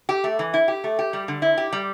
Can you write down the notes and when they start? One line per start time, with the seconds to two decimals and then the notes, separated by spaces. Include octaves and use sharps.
0.09 G4
0.24 A3
0.39 E3
0.54 E4
0.68 G4
0.84 A3
0.99 G4
1.13 G3
1.28 D3
1.42 E4
1.58 G4
1.73 G3